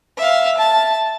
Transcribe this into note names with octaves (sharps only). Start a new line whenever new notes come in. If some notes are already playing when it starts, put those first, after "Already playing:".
E5 F5
A5